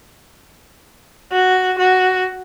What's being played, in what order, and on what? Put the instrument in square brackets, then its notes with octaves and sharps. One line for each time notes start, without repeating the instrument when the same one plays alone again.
[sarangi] F#4
F#4